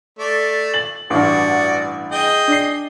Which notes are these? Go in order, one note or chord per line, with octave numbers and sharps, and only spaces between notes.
A3 D5
A6 F#7
A1 G2 F#4 D5
G#4 D#5 G5
D4 C7